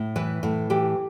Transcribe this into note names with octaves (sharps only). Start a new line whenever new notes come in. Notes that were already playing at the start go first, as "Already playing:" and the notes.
Already playing: A2
E3 B4
A2
E3 G4